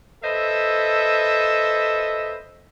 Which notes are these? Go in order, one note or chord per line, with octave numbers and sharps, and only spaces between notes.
A4 B4 C5 D#5 E5